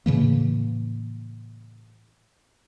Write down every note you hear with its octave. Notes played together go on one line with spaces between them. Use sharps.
A2 C#3 E3 A#3